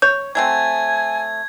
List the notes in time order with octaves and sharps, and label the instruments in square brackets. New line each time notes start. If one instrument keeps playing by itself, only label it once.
[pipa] C#5 [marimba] G6
[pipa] F#3 A3 C4 [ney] G#5 [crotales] G#6